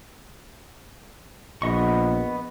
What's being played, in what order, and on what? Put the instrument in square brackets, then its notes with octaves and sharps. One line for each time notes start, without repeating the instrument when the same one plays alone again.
[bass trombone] A#1 [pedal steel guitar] B3 D#5 C#6